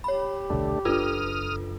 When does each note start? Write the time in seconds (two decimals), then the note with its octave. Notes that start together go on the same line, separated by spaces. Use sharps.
0.04 G4 C#5 B5
0.50 D#1 B1 D3 A3 D4
0.85 F#1 D4 F4 A4 B4 D#6 F6